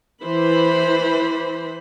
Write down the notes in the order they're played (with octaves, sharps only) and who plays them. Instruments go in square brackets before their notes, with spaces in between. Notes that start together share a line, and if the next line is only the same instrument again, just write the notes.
[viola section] E3 C5 B5